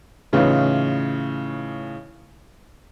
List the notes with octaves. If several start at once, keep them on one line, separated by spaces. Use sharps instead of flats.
A2 C#3 E3 D#4 F4